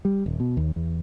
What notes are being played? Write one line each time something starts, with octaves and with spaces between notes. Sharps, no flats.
G3
D#1
B2
D#2
E2